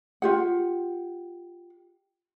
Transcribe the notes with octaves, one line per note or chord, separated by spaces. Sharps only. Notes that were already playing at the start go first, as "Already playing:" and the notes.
F4 G4 F#5